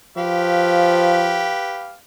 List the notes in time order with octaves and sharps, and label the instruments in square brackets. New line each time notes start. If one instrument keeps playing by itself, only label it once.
[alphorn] F3 [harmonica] G4 B4 F5